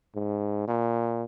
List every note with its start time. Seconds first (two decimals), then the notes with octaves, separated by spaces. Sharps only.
0.15 G#2
0.68 A#2